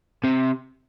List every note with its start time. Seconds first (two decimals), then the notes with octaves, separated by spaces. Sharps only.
0.24 C3